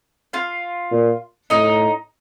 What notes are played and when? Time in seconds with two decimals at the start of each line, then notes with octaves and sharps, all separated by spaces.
0.33 F4 F5
0.91 A#2
1.50 A2 D#4 D#5